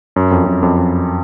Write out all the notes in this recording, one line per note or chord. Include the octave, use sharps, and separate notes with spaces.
F#2
F2
F#2
F2
F2